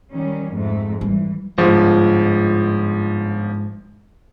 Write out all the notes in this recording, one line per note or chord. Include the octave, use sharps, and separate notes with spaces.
D#3 G3 C#4
F2 G#2 A3
E3 G3
G1 G#2 F3 G#3